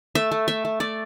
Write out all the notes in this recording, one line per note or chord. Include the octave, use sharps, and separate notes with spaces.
A3 E5
A3
A3 E5
A3
A3 D5